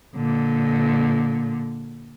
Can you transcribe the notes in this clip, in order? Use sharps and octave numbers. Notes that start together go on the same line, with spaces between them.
A#2 D3